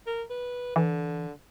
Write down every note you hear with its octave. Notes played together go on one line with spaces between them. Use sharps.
A#4
B4
D3 E3